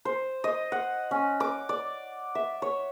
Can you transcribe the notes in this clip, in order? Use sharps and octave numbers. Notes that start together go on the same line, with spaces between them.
C5
D#5
F#5
C#4
D6
D5
E5
C#5